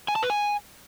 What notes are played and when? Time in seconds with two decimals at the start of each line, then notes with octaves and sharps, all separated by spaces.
0.08 G#5
0.16 A5
0.23 B4
0.30 G#5